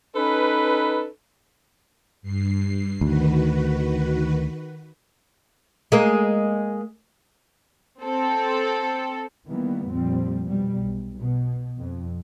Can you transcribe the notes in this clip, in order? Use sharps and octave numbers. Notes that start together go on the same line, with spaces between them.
C#4 D#4 A4 B4
G2 C7
D2 D#3 F#4 B4
G#3 A#3
C4 A4
D#3 E3 G3 A#3 B3
F2 A#2 F3 G3 C4
B2 G3
B1
B2
F2